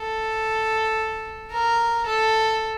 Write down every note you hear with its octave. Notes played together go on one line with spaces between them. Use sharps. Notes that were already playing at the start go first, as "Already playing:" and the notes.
Already playing: A4
A#4
A4